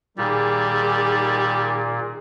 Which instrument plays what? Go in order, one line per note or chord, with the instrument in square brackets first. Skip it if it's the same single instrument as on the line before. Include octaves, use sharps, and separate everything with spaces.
[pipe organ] A#2 [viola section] D#3 G#4 [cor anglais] G3